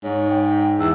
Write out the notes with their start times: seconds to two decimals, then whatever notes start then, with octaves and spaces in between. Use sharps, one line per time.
0.03 G#2 C#5
0.30 G5
0.79 E2 E6